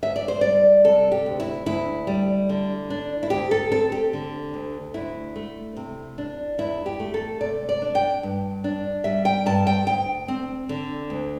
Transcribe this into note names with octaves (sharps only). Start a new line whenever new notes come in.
D2 E5
D5
C5
G3 D5
C3 A4
G4
D2
E4
D2 E4
G3
D3
D4
E4
D2 G4
A4
C4 A4
G4
D3
D2
D2 E4
A3
C3
D4
E2 E4
G4
A3
A4
C3 D5
D5
D4
G5
G2
D4
G3 E5
G5
G2 A5
G5
D2 G5
C4
D3
D2